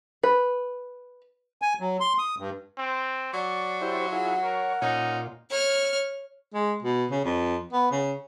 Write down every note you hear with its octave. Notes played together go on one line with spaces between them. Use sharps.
B4
G#5
F#3
C6
D#6
G2
C4
F#3 D5 C#6
E4 G4 C5
E4 F4 G#4 F#5
A#4 C#5
A#2 C#4 D#4 F4
C#5 F6
G#3
B2
C#3
F2
B3
C#3